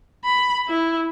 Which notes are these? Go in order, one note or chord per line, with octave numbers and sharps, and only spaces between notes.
B5
E4